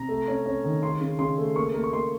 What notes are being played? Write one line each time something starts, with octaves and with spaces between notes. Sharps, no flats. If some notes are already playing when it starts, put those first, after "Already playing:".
Already playing: C3 A#5
A3
C#4
C#4
D#3
C#3 C6
C#3
C#3 C6
A3
A#3 C#6
A#3
C#6
A#3 C6